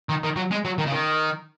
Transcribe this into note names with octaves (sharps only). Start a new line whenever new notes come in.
D#3
D#3
F#3
G#3
F#3
D#3
C#3
D#3